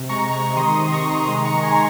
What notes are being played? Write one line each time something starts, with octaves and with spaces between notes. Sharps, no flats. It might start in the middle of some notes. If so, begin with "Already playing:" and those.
Already playing: C3
G#3 A#5 C#6
C3 A#5 C#6
D#3 C6 D#6
C3
A#5 C#6
D#3
G#3 C6 D#6
A#5 C#6
G#3
G#5 C6